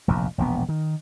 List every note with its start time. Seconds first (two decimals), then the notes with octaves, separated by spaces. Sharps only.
0.08 F1 A#1 E2
0.38 E1 A#1 B3
0.69 D#3